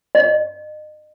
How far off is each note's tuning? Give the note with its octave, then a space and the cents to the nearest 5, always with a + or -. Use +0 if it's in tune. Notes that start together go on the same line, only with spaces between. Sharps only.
D#5 -35